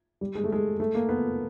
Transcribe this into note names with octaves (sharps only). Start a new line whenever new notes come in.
G3
G#3
A3
G#3
A3
A#3
B3